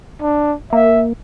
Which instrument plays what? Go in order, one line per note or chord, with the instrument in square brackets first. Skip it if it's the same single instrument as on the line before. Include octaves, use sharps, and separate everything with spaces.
[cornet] D4
[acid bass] A#3 [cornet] E5